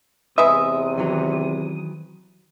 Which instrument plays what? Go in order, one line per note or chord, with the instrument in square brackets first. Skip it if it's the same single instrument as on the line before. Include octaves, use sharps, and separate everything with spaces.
[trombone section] E2 C3 [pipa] G#3 B4 E5 [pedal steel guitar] D#6
[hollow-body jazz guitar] D#3 E3 F#3